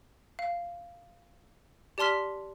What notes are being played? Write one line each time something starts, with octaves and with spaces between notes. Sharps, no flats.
F5
G4 D5 A5 C6 F6 B6